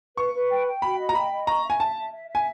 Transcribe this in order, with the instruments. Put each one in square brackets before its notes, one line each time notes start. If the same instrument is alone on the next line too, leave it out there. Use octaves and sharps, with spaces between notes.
[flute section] B4 [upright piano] C#6
[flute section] B4
G5
G5
[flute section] F#4 [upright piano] B5
[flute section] D#5
[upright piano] A#5
[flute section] G5 [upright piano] B5
[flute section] D#5
[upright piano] A#5 [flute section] C#6
[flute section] E5
[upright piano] G#5
[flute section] E5 [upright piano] A5
[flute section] E5
E5
E5
[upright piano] G#5